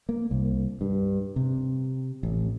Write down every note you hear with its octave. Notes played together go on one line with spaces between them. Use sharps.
A#3
C2
G2
C3
A1